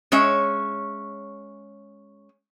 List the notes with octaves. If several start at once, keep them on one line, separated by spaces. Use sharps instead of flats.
G#3 C#4 C#5 E5